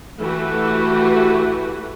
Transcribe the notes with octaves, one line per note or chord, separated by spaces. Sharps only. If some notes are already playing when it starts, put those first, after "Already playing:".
E3 A3 F#4 G4 B4